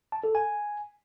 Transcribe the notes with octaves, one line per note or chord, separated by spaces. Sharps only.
A5
A4
G#5